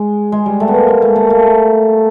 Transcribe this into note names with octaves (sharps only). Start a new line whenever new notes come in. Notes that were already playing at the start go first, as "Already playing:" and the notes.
Already playing: G#3
G#3
G3
A3
B3
A#3
G#3
A3
A#3
A3